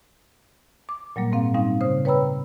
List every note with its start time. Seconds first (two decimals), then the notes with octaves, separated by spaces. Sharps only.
0.89 D6
1.16 A#2 F#3 G3 A#3
1.32 G#2 A#3 C4 F5
1.54 G3 C4 C#4 D#4 F5
1.81 C#3 C5 D#6
2.05 B4 C#5 G5 A#5 B5 E6